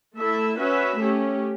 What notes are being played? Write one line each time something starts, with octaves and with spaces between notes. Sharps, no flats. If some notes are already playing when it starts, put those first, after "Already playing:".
A3 E4 A4 E5
C#4 F#4 B4 E5
A3 C#4 G4